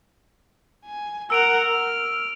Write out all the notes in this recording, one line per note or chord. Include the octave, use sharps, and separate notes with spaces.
G#5
A#4 F#5 E6 D7 F7
F6